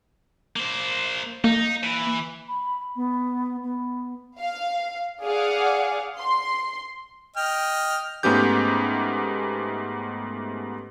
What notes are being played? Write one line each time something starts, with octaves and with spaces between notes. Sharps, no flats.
A#3 C5
A#3 D#4
E3
B5
B3
B3
F5
G#4 D5 F5 F#5
C6
D#5 G5 F6
G#2 A3 B3 C#4 G4 G6